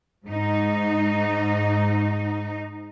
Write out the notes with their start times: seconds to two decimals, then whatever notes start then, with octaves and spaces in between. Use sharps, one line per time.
0.26 G#2 D#4